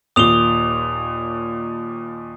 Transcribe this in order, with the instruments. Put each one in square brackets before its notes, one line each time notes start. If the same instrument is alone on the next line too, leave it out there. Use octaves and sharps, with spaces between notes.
[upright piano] D#2 A#2 G7 [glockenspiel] D#6 F7